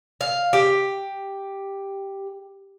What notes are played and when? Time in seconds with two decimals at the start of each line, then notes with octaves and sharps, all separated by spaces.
0.21 F5
0.53 G4